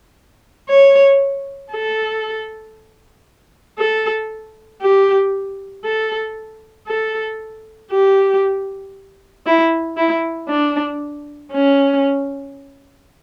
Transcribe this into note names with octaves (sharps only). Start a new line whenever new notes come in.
C#5
A4
A4
G4
A4
A4
G4
E4
E4
D4
C#4